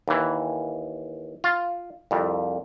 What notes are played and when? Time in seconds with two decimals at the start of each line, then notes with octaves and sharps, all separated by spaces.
0.08 D#2 E3
1.44 F4
2.11 C2 F2